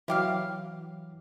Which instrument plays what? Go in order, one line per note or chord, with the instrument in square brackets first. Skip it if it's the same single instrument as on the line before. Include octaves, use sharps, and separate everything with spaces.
[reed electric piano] E3 F#3 [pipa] E4 G4 F5